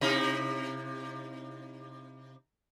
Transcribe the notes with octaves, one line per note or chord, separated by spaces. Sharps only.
C3 D#4 E4